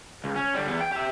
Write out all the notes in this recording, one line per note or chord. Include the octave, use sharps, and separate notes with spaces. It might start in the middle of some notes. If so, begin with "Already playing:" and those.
C#2
C#4
D3 G3
E2 B3
G5
G4 E5